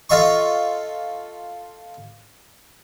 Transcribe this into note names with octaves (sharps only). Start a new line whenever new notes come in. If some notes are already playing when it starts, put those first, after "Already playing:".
F4 A4 D#5 C6 C#6